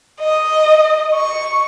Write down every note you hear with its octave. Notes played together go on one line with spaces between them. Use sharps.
D#5
C#6